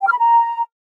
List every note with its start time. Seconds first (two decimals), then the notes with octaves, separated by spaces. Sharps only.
0.01 G5
0.07 F6
0.12 B5
0.17 A#5